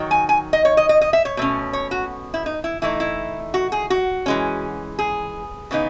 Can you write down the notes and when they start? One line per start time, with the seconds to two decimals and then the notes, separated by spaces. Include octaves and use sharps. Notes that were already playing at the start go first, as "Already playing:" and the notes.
Already playing: D#3 F#3
0.11 G#5
0.29 G#5
0.53 D#5
0.65 C#5
0.77 D#5
0.89 D#5
1.01 D#5
1.13 E5
1.25 C#5
1.37 B2 A3 C#4
1.73 C#5
1.91 F#4
2.34 E4
2.46 D#4
2.64 E4
2.82 E3 A3 D#4 E4
3.00 E4
3.54 F#4
3.72 G#4
3.90 F#4
4.26 E3 G#3 C#4
4.99 G#4
5.71 C#3 E3 B3 D#4